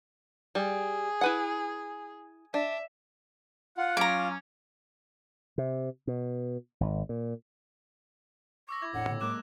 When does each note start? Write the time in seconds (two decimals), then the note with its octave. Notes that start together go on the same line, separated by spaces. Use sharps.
0.55 G3 G#4
1.21 E4 B4 F#5
2.54 D4 E5
3.77 F4 F#5
3.97 F#3 C#4 A#5 D6
5.58 C3
6.07 B2
6.80 G#1
7.09 A#2
8.69 C#6 D6 E6 A#6
8.82 E4 D6 G#6
8.94 E1 A2 D4 F#5
9.08 A#2 D3
9.21 F#3 G#3 A#3 D6 F#6 E7